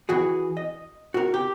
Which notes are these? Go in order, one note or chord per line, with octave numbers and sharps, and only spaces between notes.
E3 F#4 G#4
D#5
F#4 A#4
G4